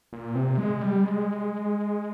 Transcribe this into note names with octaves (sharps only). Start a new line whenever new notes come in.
A#2
C3
G#3
G3
G#3